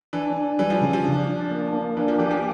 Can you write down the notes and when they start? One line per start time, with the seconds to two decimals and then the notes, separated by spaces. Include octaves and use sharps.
0.13 E3 D4
0.37 D4
0.59 E3 G3
0.70 F3
0.82 C#3
0.93 F3
1.04 D4
1.28 D4
1.51 A#3
1.73 A#3
1.97 E3 D4
2.08 F3
2.19 E3 G4
2.31 F3